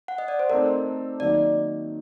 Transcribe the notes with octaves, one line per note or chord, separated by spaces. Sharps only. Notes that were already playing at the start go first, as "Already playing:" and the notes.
F#5
D#5
D5
C5
A3 C4 D#4 A4 A#4 D5
D#3 F#3 A#3 D#4 D5